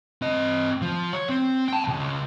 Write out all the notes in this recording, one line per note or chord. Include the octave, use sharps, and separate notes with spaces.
C4 D#5
F3
C#5
C4
G5 A5
C#2